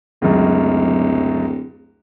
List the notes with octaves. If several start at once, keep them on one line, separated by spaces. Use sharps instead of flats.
D1 C#2 F#2